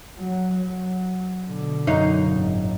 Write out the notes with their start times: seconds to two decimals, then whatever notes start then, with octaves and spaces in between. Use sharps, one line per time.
0.19 F#3
0.54 F#3
1.47 B2 D3
1.87 F#2 D#4 F5
2.31 G#1 A#2